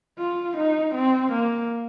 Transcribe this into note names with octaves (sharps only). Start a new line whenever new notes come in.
F4
D#4
C4
A#3